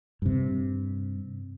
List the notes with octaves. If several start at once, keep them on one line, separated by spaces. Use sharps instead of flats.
G2 C3